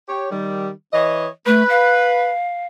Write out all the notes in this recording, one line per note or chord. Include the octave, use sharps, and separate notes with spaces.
G4 C#5
D#3 G3
E3 C#5 D#5
A3 B4
F5